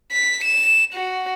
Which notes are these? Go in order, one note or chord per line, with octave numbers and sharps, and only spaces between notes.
B6
E7
F#4